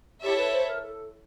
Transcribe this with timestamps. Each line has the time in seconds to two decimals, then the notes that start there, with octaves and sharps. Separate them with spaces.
0.22 E4 G4 A4 C#5 E5
0.37 B4
0.52 C5
0.67 A#4
0.82 A4